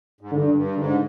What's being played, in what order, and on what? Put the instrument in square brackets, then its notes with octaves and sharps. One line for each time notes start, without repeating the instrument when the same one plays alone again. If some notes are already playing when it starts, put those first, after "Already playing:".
[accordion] G#2
[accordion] G2 [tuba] D3
[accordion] G2
[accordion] G#2 [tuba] D3